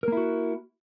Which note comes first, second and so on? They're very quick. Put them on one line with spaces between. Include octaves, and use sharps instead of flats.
A#4 A#3 E4 F#4